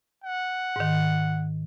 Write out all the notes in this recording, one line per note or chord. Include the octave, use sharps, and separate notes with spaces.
F#5
G#2 D#3